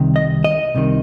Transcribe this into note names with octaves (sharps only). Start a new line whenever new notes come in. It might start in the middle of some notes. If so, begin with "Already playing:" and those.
Already playing: C2 C3 D#3
D#5
D#5
C2 C3 D#3